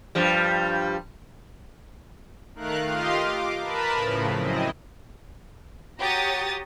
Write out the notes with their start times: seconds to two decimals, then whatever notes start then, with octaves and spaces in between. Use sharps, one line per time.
0.15 G2 F3 G3
2.55 D#3 A3 A#4 F5 F#6
2.87 F4 G4 D#5 F5 C6
3.25 D6
3.61 A#4 B4 A5 B5
3.93 A2 C#3 F3
4.34 F#2 C4 E4 D#5
6.00 F#4 G4 C#5 A#5 D#6 A6